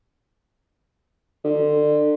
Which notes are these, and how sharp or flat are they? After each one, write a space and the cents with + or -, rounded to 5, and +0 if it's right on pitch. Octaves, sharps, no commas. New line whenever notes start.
D3 +30